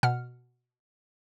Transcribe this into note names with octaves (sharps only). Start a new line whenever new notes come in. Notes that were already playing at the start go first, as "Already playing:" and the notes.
B2 F#5 F6